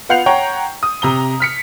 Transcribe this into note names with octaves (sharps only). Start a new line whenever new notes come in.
B3 F4 F#5 G6 C7 F7
C#5 F#5 G5 A#5 C#6
D#6
C3 A#5 G7
F6 B6 C#7